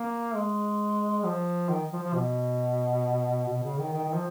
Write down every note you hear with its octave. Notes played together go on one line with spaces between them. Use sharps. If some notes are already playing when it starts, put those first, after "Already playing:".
Already playing: A#3
G#3
F3
D#3
F3
F3
B2
B2
C#3
D#3
D#3
D#3
F3